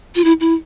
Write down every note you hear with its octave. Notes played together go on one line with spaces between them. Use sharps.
F4
E4
E4